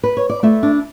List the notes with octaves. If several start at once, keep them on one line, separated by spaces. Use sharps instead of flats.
B4
C#5
D5
A3 E4 E5
D4